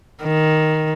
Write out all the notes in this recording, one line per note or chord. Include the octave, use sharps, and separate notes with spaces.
D#3